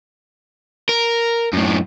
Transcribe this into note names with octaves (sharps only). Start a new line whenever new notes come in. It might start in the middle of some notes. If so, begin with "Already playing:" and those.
A#4
F#2 A2